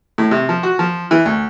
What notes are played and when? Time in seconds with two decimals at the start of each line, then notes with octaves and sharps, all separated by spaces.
0.18 A2
0.31 C3
0.49 F3
0.63 F#4
0.79 F3
1.11 E3
1.25 D2